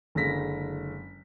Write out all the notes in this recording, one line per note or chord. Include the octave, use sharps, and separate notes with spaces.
F#1 D3 G#3 A#6 B6